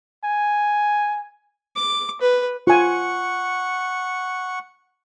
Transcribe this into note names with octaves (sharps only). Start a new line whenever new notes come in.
G#5
D6
B4
F4 F#5 G#5 C#6